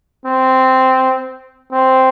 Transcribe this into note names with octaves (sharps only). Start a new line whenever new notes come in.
C4
C4